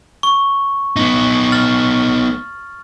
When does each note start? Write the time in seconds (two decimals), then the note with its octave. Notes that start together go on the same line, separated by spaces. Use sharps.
0.23 C#6
0.96 B3 D#4
1.52 F6 A6 F#7